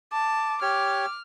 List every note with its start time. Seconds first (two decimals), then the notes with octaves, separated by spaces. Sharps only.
0.12 A5 D6
0.62 G4 C#5 F6